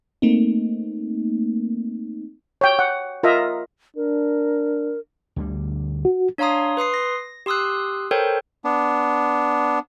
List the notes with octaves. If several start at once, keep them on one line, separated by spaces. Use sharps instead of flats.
A3 A#3 C4 D#4
C#5 G5
F#5
F4 A#4 D#5 E5 A#5
D4 A#4
D2 D3 G3
F#4
D4 C#5 F5 A#5 C6 D#6
B4 C6 D#6 C7
A#6
G4 C6 D#6 E6 F#6
A4 A#4 C5 C#5 G5
B3 D4